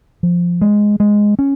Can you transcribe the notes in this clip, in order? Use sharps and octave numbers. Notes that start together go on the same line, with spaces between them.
F3
G#3
G#3
C#4